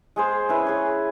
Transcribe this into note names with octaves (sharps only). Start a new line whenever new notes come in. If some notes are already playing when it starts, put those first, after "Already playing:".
G#3 G#4 C5
C#4 E4 B4
G#4 C#5